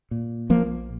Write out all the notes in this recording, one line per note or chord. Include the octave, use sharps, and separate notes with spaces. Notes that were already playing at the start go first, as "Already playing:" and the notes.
A#2
A#1 F3 A#3